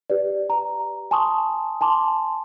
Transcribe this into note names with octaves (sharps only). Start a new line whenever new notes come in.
G4 B4 D5
A#5
G#5 A5 C6 C#6 D#6
G#5 A5 C6 D6